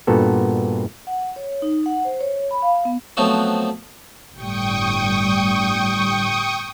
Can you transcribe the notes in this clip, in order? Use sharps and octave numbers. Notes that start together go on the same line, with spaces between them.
G2 A#2 B3 F#4 A4
F#5
C#5
D#4
F#5
C5
C#5
B5
F5
B3
F3 F#3 A3 B3 C4 F#4
G1 A2 G3 G5 C#6 D#6